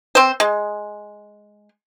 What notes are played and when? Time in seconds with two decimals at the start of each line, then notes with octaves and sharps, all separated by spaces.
0.15 C4 C5
0.40 G#3